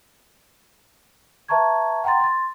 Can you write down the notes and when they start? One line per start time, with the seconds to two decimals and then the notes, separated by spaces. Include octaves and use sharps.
1.48 B4 E5 A5 A#5 C#6 G#6
2.04 F#5 G5 A#5 C6 A6
2.20 C6 A6